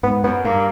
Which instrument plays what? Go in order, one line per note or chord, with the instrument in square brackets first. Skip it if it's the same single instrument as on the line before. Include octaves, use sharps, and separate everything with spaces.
[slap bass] G#2 [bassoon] B3
[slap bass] F#2 [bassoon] B3
[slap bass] G2 [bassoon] A#3